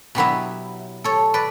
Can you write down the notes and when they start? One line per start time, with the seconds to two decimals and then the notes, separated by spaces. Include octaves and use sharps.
0.15 B2 F#3 B3 E4 G4 B4
1.04 A4 C#5
1.34 B4 D5